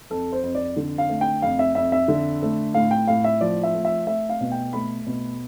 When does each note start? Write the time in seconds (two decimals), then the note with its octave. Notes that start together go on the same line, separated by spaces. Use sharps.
0.10 F2 A4
0.32 C5
0.43 F2
0.55 D5
0.76 D3
0.98 F5
1.09 A3
1.21 G5
1.42 F2 F5
1.59 E5
1.75 F2 E5
1.92 E5
2.08 D3
2.42 A3
2.74 A2 F5
2.91 G5
3.07 A2 F5
3.24 E5
3.41 F3 D5
3.63 E5
3.75 A3
3.85 E5
4.07 A3 E5
4.29 F5
4.41 B2
4.52 G5
4.73 A3 B5
5.07 B2